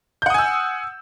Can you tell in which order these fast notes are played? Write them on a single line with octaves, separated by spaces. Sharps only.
G6 F#5 D#6 G#5 E6